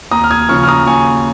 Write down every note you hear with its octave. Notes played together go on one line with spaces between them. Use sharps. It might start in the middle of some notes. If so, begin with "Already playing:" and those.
D#2 A#5 D#6
F6
D#6 G#6
C#3 F3 C#6 F6
F6
A#5 D#6
D#2 G#5 C#6